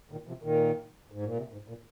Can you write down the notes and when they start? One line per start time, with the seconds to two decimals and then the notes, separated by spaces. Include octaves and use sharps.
0.12 A#2 D#3
0.27 C3 F3
0.43 A#2 D#3
1.12 G#2
1.25 A#2
1.37 C3
1.52 G#2
1.68 A#2